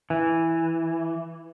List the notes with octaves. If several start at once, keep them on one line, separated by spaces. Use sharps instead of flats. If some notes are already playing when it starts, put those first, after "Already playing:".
E3